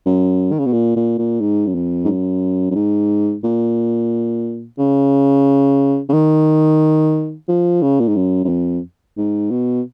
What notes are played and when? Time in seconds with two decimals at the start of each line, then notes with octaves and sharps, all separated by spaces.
0.06 F#2
0.52 D#3
0.59 C#3
0.66 B2
0.73 A#2
0.96 A#2
1.18 A#2
1.41 G#2
1.67 F#2
1.75 F2
2.04 G#2
2.08 F#2
2.70 F#2
2.75 G#2
3.44 A#2
4.78 C#3
6.09 C#3
6.13 D#3
7.48 F3
7.82 C#3
8.00 A#2
8.08 G#2
8.16 F#2
8.44 F#2
8.49 F2
9.17 G#2
9.51 B2